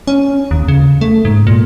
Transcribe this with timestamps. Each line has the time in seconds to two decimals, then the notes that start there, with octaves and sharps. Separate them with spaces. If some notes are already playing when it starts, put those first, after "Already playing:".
0.07 C#4
0.51 D#2
0.68 C#3
1.01 A3
1.25 G#2
1.47 A#2